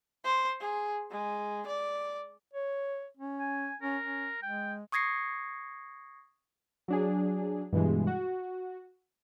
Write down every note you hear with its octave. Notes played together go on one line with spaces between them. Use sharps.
C5
G#4
G#3
D5
C#5
C#4
G#5
C#4 A#4
C#4
G#3 G5
C#6 D#6 G#6 A#6 C7 C#7
F#3 D4 G#4
G2 B2 E3 G#3
F#4